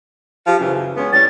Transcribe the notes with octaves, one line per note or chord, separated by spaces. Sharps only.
F3 F4 G4
F#2 C#3 E3
G#3 B3 C#4
A2 G3 C#4 A6